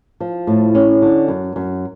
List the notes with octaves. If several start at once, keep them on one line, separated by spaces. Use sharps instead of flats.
F3
A2
C#4
D3
F#2
F#2